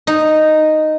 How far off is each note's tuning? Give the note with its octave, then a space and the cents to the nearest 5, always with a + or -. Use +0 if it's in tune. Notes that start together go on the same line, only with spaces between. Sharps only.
D#4 -5